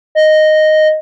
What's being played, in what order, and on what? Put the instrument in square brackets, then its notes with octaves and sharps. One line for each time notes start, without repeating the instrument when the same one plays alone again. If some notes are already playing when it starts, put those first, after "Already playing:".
[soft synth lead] D#5